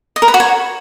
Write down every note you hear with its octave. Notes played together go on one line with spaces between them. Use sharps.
D#5
A#4
B4
F#4
C#5